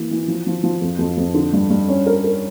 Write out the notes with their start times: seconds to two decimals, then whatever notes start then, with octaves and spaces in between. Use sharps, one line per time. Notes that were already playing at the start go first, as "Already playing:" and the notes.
Already playing: E3 A#3
0.11 E3
0.28 F3
0.47 F3
0.64 F3
0.82 F2
0.99 F2
1.18 F2
1.34 D3
1.53 G2
1.70 G2
1.89 C#4
2.06 A#4
2.24 A#4